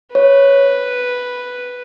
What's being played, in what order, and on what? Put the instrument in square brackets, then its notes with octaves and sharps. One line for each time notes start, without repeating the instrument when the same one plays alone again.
[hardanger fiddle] B4 [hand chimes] C#5